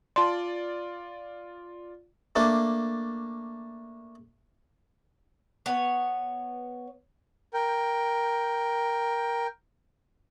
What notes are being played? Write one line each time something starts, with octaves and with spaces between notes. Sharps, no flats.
F4 D5 A5 C6
A3 A#3 D4
B3 C#5
A#4 G5